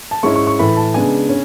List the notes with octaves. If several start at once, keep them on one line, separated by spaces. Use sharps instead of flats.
A5
G#2 G#3 C#4 E4 C#6
C#6
C#6
A2 E3 A3 B5
A5
C#3 G#3 B3 D4 G#5
C#3 C#4